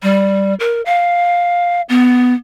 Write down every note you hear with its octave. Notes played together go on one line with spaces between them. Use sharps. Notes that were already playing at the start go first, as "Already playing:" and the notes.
G3
A#4
F5
B3